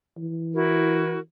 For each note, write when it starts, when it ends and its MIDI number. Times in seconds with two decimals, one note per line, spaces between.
0.17 1.19 52
0.55 1.19 64
0.55 1.19 66
0.55 1.19 70